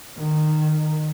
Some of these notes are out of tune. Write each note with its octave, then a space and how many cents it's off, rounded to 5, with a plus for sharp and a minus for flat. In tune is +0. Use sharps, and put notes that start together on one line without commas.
D#3 -20